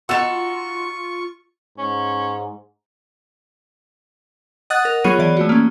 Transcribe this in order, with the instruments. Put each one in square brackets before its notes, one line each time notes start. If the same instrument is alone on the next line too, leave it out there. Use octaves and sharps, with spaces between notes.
[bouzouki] D#4 F#4 [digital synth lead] F4 [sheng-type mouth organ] C#6 [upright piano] E6 A6 E7
[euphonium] G#2 [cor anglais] C#4
[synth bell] D#5 F#5 D#6 F#6 A6
A#4
F#3 B3 F4 G#4 C#5 D#7
E3 D5
A3 F#4
A#3 C#4